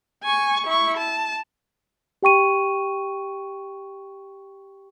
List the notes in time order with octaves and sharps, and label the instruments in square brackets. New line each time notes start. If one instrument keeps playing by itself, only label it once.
[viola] G#5 C#6
E4 C#6
A5
[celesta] G4 G5 C#6 D#7